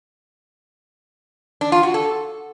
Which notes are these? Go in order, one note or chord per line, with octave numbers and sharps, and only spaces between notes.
D4
F4
F#4
A4